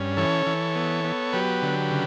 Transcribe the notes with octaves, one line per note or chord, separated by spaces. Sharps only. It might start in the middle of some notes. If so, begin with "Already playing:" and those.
Already playing: G2 C#4
E3 A4 C#5
E3
B3
B3
F#3 G4 B4
D3
C#3